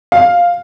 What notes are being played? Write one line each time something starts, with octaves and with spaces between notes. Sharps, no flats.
F5